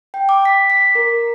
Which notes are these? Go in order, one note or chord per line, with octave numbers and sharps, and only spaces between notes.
G5
D6
B6
B6
A#4